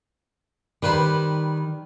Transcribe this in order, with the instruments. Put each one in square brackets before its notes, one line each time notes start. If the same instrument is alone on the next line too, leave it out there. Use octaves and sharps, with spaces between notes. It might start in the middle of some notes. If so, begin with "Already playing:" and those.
[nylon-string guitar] D#3 [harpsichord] G3 B4 C5